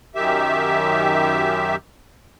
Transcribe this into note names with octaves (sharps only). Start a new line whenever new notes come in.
F#2 D#3 G4 E5